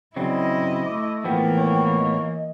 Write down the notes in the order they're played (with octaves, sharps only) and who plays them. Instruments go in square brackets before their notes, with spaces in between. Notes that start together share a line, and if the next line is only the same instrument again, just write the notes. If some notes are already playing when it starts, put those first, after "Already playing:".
[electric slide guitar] C#3 F#3 C4 [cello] E4 D#5 [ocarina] D5
[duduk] A3 [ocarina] D6
[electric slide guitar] A2 F3 B3 [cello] E3 A#3 [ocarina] G5
[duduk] C#5
[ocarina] D#5